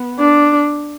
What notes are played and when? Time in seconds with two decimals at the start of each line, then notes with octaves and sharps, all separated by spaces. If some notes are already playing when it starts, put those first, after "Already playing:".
Already playing: B3
0.19 D4